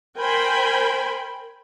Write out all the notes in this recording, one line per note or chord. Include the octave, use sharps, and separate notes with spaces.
A#4 C5 G5 G#5 B5